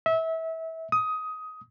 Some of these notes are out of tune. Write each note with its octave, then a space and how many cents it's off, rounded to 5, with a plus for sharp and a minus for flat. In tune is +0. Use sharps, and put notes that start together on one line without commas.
E5 -25
D#6 +15